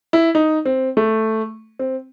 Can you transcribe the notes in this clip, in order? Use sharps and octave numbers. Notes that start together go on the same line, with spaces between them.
E4
D#4
C4
A3
C4